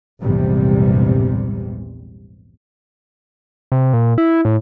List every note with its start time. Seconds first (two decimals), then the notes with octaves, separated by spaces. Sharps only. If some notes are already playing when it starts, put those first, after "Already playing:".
0.21 A#1 E2 G#2 C3 G3
3.72 C3
3.93 A#2
4.18 E4
4.45 A2